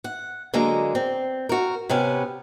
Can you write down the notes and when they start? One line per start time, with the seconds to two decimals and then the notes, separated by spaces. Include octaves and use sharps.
0.04 F#5
0.54 D3 F#3 G#3 A#3 A#5
0.95 C4
1.49 F#4 A#4
1.89 C3 B3 C#4 G4